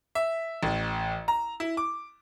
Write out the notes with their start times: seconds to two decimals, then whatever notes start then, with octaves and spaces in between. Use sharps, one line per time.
0.15 E5
0.63 A1
1.28 A#5
1.60 E4
1.77 D6